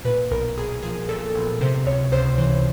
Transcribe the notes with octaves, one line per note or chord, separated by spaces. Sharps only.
A#2 B4
B1 A#4
B1 G#4
F3 G#4
A#2 A4
B1
C3 C5
C#2 C#5
C#2 C5
E3 C5